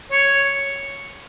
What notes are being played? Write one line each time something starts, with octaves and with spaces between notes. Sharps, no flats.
C#5